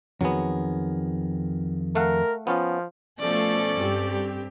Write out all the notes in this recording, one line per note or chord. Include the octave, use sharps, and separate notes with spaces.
F2 D#3 F#3 B3 G#4
A3 A#4 F5 F#5
F3 B3 C#4 F4
B2 F3 A3 C#4 A4 D5
G2 C4 G4